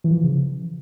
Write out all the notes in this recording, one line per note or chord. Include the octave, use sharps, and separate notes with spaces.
E3
F3
E3
C#3